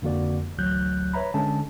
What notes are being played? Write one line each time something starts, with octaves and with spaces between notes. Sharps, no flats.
F2 D3 A#3 F#4 D5
A1 D2 F#3 F#6 G6
B4 C#5 E5 A#5 B5
D3 G#3 C#4 A5